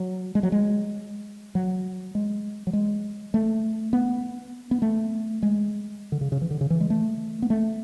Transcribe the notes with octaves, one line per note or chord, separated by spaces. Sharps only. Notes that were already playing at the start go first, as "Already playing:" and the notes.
Already playing: F#3
G#3
F#3
G#3
F#3
G#3
F#3
G#3
A3
B3
B3
A3
G#3
D3
C#3
C#3
E3
D3
C#3
E3
G#3
A3
B3
A3